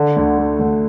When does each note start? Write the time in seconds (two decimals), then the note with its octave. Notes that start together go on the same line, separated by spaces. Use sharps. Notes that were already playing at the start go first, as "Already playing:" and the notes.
Already playing: D3
0.16 D2
0.38 A3
0.59 D2